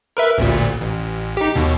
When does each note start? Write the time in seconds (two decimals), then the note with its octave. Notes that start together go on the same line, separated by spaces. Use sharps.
0.17 A#4 B4 E5
0.38 A1 D2 A#2
0.81 A1
1.37 D#4 G4
1.56 D#2 B2